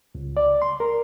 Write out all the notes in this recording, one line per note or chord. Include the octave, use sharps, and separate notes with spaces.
C#2
D5
C6
A#4